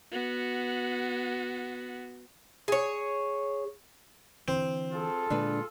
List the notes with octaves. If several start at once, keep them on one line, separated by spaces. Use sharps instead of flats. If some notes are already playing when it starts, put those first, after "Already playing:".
B3 F#4
G#4 C#5
D3 E3 C4
F4 G#4 A4
A#2 D3 G#3 D4 B4